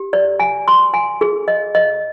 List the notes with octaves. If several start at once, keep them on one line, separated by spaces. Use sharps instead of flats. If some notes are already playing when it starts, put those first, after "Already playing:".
Already playing: G4
D5
G#5
C6
G#5
G#4
D#5
D#5